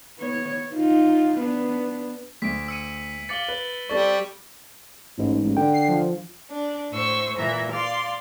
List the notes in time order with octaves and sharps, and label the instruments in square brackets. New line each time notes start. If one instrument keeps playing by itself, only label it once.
[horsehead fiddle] B3 C#5
D#4 F4
B3 D4
[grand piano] D2 [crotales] B6 D7
[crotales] E6 C#7 D#7
[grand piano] F5 D6 C#7 [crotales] A6 F#7 G7
[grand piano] B4
[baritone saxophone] G3 [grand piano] C4 A4 D5 [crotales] C#6 A6
[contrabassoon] A1 [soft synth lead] G#2
[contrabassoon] A1
[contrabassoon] D3 [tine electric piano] G5
[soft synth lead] C7
F3
[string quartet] D4
A2 C5 C#6 E6
A#2 E3 E5 A#5
D5 F5 C6